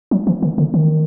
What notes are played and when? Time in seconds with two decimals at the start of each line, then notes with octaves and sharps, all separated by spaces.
0.11 F#3
0.27 E3
0.42 D#3
0.58 D3
0.74 D#3